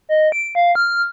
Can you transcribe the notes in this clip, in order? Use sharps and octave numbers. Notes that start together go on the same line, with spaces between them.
D#5
D7
F5
F6